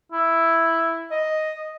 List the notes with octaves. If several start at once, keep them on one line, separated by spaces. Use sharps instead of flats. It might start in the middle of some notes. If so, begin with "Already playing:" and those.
E4
D#5